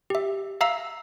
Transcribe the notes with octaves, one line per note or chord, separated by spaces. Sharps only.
G4 E5
E5 F5 A#5 E6